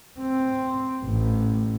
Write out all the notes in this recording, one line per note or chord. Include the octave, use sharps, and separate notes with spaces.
C4
A1